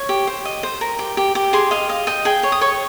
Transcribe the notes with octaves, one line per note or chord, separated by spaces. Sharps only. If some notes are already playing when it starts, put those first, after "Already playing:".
Already playing: C#5 C#6
G4
C5
D#5
C5
A#4
G4
G4
G4
G#4 C6
D#5 F5
D#5 F5
D#5 G5
G#4 G5
C#5
D#6
C#5 C#6